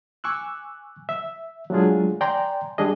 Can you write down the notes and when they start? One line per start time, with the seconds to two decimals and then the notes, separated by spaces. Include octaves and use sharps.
0.24 G#5 C#6 D6 E6 F#6
1.09 E5
1.70 F#3 G#3 A3 D4 F4 G#4
2.21 D5 G5 G#5 A#5 C6
2.78 G3 D4 G#4 D#5